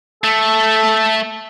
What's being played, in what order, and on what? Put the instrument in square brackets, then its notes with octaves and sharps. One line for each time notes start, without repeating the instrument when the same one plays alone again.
[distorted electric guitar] A3 [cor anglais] A4